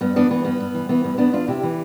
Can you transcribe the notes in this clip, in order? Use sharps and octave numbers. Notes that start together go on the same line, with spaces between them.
G2 B3
E3 B3 D4
E3 B3
G2 B3
G2
E3
E3 B3
G2 B3
E2 B3 D4
E2 D4 F4
C3 E4 G4
E3